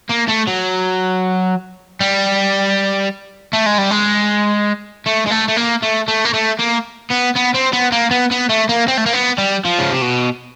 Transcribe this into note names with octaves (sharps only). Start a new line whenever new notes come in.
A#3
A3
F#3
G3
A3
G#3
G3
G#3
A3
G#3
A3
A3
A#3
A3
A3
A#3
A3
A#3
B3
B3
C4
B3
A#3
B3
B3
A3
A#3
C4
A3
A#3
B3
G3
F3
C#3
C3
B2